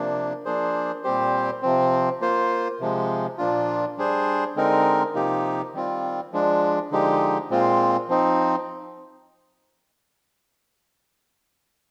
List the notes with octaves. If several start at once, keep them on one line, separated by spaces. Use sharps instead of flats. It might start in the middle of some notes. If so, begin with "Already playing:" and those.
Already playing: C3 F3 A#3 D4
F3 A#3 D4 G#4 C5
A#2 G3 C4 G4 C5
C3 F3 C4
A#3 F4 C5
C3 F3 G#3
A#2 F3 A#3 D4 F4
G3 D4 G#4 C5
D3 G#3 C4 D#4 A#4
C3 F3 A#3 D#4 G4
D#3 G3 C4 F4
F3 G#3 D4
D3 F3 G#3 D#4 G4
A#2 G#3 C4 F4
F3 C4 D#4